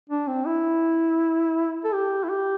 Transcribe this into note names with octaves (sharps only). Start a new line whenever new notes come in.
D4
C4
E4
A4
G4
E4
G4